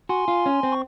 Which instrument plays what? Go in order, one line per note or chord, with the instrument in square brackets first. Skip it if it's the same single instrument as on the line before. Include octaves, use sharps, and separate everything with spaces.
[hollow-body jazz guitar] F#4 [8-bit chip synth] G#5 C6
[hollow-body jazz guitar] F4
C#4
C4
[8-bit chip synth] C#6